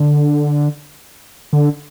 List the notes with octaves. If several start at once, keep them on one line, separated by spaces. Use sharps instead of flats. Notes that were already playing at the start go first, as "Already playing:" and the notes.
Already playing: D3
D3